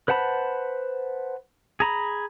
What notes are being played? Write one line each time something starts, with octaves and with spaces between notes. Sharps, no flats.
B4 C5 F#5 A5 B5
G#4 A#5 B5